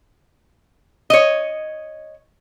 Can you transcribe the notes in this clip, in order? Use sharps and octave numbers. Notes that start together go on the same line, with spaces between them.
C#5 D#5